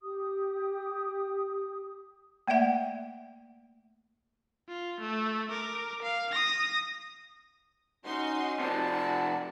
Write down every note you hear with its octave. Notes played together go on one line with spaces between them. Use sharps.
G4 D#6
A3 A#3 D5 E5 F#5
F4
A3
A#4 D6
F5
D#6 A#6
C#4 D#4 F#4 C6
C3 F3 D5 A5
F#4